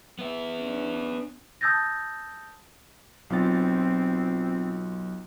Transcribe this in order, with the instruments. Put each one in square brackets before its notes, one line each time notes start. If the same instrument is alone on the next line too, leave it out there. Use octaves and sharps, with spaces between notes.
[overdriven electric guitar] B3 E5
[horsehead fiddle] C#4 D4
[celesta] A5 D#6 E6 G6 A6 A#6
[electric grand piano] B1 F4 A6 [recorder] C4